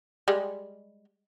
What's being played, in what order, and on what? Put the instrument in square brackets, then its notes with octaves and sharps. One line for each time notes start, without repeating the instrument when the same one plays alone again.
[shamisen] G3 G#3